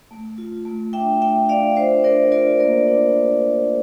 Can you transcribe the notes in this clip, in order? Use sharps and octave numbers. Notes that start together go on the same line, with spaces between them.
A3
F4
A3
D4 E5 G5
A3 E5 G5
D4 D5 F5
F4 C5 E5
D4 A#4 D5
F4 A#4 D5
A#3 A#4 D5
D4